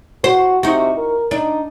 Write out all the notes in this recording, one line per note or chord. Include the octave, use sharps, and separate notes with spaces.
F#4 C5
C3 D#4 F#4
A#4
D4 D#4